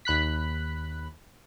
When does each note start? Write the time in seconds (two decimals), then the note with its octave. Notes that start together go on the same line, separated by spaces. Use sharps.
0.05 D#2 B5 F#6 B6